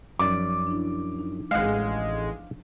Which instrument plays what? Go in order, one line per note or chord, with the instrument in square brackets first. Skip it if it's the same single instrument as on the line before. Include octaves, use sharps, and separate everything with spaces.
[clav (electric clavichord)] F#2 D5 [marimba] F3 D#4 [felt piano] D6
[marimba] D4 E4
D#4
[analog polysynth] A1 G#3 [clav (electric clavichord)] F5 F#5